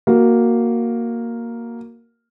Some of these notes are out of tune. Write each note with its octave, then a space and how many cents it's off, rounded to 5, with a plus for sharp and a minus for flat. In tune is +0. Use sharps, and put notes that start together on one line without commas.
A#3 +0 F#4 +0